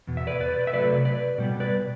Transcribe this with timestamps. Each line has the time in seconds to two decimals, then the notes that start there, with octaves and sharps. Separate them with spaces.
0.07 E2 B2
0.17 E5
0.27 B4 D5
0.40 B4 D5
0.67 E5
0.73 C3 F#3 A3 B4 D5
1.05 B4 D5
1.38 B2 G3 B3
1.60 B4 D5